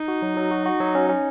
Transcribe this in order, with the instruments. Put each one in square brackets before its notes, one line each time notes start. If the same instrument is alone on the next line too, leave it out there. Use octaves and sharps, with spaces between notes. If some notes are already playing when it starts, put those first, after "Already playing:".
Already playing: [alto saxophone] D#4
[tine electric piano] F#4
F#3
F#3
F#4
F#4
F#3
C#4
C#4